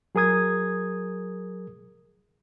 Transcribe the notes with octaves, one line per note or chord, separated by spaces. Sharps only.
F#3 G#4 A#4 D#6 G#6